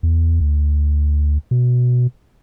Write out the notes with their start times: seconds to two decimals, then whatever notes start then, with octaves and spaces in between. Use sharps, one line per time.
0.03 E2
0.41 D2
1.51 B2